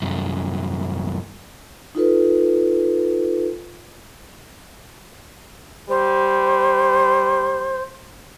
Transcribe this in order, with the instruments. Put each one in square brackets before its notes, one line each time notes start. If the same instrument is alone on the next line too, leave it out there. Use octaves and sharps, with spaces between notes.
[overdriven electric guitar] C2 F#2
[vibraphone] D#4 F4 A4 B4
[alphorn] G3 [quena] C5